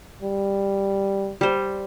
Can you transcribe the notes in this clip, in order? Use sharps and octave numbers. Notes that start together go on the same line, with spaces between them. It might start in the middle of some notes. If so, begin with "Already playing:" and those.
G3
G3 C5